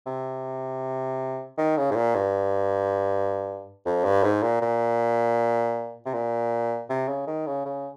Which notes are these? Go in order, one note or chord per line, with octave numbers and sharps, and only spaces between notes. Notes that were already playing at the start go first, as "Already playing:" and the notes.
C3
D#3
C#3
G#2
A#2
G2
F2
G2
G#2
A#2
A#2
C3
A#2
C3
C#3
D#3
C#3
C#3